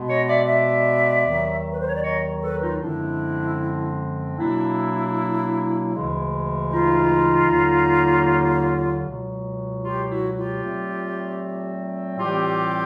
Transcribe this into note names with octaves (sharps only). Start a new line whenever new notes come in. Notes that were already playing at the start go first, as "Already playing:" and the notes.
Already playing: B2 G#3 B3
C#5 D#5
D5 E5
D5 E5
D#2 D#3 F#3
B4
C5
C#5
D5
C#5 D#5
A4 B4
D#4 F4
F#2 D3 F3 G#3 C4 D4 E4
B2 F#3 A#3 D4 E4
D2 C#3 E3 G#3
D#4 F4
D#2 D3 F#3 A#3
C#2 B2 F#3
F4 G4
E4 F#4
F4 G4
A#2 F#3 A3 C4
A2 E3 G3 C4 F4 G4